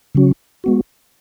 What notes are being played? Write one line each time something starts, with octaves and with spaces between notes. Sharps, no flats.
C#3 F#3 C#4 F#4
G#3 B3 F#4